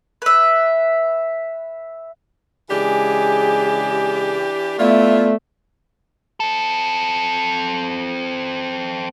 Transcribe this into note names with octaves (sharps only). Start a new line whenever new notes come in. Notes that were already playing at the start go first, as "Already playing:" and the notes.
B4 E5
C#3 E3 G#3 D4 G4 G#4
A3 B3 E4 F4 D5
C4 A4